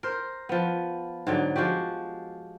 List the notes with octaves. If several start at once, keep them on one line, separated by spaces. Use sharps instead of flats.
A#4 C5
F3 B3
G#2 D3 F#3
F3 G#3 F#4 G4